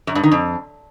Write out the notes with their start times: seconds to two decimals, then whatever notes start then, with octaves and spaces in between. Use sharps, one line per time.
0.07 F#2
0.15 G2
0.23 D#3
0.32 F2